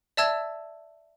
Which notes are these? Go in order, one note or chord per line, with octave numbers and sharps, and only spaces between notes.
D5 E5 A5 E6 G#6